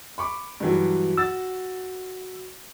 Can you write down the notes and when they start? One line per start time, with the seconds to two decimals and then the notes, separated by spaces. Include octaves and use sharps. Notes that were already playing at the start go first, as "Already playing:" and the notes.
0.18 B5 C#6 D6
0.60 G2 E3 F#3
1.18 F#4 E6 A6